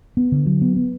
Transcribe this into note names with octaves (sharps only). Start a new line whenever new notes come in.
B3
D3
F#3
B3
B3